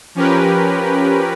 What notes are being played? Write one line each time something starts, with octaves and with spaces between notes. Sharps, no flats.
F3 C#4 G4 A#4 B4